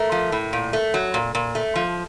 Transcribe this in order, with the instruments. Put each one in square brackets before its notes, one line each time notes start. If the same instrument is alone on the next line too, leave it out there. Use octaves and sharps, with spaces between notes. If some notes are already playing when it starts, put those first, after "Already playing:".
Already playing: [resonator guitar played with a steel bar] A3 A#4
F3
A2
A#2
A3
F#3
A#2
A#2
A3
F3